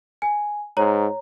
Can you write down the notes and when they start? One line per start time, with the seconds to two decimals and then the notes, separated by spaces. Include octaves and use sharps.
0.22 G#5
0.77 G#2 C#5 A#5